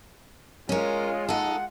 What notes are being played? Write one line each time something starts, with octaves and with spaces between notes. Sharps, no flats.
G#3 C#4 F4 A#4 C#5
D#4 A4 F#5